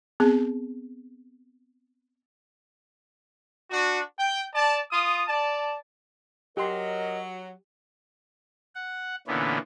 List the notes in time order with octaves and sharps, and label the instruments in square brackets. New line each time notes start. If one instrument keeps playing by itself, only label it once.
[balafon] B3 C4 G#4
[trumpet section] D4 F#4
G5
D5 A5
F4 D#6
D5 A5
[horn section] F#3 [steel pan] G4 C6 [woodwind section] A#4 D#5
[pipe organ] F#5
A#2 D3 E3 B3 C#4